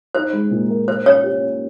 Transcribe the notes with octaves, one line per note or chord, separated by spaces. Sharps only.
D#4 C5
G#3
A#2
A#4
A#4 C5
C#4 C#5
G4
C#4